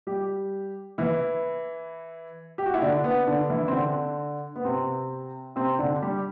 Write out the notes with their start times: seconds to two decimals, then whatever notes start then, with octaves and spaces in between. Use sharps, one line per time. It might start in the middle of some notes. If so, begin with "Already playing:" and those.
0.07 G3 G4
0.98 E3 E4
2.58 G4
2.66 F#4
2.74 E4
2.82 D3 D4
3.04 B3
3.27 D3 D4
3.50 E3 E4
3.68 C4
3.73 D3 D4
4.56 B3
4.65 C3 C4
5.56 C3 C4
5.79 D3 D4
6.02 G3 G4